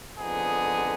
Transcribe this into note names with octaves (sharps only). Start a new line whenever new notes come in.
F2 D3 F3 B3 D#4 G#4